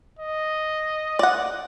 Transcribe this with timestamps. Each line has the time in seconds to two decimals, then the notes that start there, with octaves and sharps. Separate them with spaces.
0.19 D#5
1.19 D5 F#5